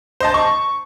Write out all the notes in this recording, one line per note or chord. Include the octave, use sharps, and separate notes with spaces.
C5 D#5 A5
C#6